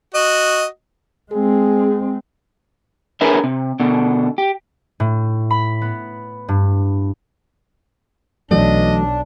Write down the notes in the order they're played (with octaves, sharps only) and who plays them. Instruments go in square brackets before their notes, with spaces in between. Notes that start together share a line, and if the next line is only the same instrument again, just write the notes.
[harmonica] F#4 D#5
[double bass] G#3 C4 [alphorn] G#4
[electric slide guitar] D4 G#4 A#4 B4 C#5 E5
C3
B2 D3
G4
[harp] A2
B5
B3
G2
[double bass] B1 [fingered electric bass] E3 F#3 A3 [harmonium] D4 [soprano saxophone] D#5